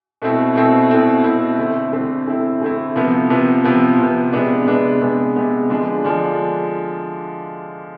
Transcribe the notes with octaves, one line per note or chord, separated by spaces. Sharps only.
B2 A3 C4 E4
B2 A3 C4 E4
B2 A3 C4 E4
B2 A3 C4 E4
D3 A3 C4 E4
D3 A3 C4 E4
D3 A3 C4 E4
D3 A3 C4 E4
C3 F3 B3
C3 F3 B3
C3 F3 B3
C3 F3 B3
C3 G#3 B3 D4
C3 G#3 B3 D4
C3 G#3 B3 D4
C3 G#3 B3 D4
D3 F3 G#3 D4
D3 F3 G#3 D4